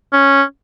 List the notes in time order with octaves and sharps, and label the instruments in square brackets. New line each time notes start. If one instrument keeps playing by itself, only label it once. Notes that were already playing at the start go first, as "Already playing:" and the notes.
[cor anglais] C#4